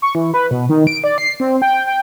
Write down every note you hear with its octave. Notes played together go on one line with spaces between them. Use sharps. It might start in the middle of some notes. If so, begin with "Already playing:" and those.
C#6
E3
B4
B2
D#3
D7
D5
C7
C4
G5
G5